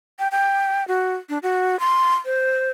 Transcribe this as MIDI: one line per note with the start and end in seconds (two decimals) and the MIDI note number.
0.19 0.28 79
0.32 0.86 79
0.88 1.15 66
1.29 1.38 62
1.43 1.79 66
1.80 2.15 84
2.25 2.71 72